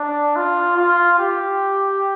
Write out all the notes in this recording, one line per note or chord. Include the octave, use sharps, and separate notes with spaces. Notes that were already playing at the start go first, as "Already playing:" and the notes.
Already playing: D4
F4
F4
G4